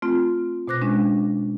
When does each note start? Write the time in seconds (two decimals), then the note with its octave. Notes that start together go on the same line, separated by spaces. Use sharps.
0.02 A3 C4 F4
0.68 B2 C5 D6 F#6 A#6
0.82 G#3 C#4 D4